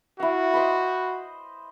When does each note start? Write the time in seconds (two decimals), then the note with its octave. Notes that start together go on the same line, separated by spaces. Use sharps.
0.20 E4 F#4 F5
0.54 C5 D#5 B5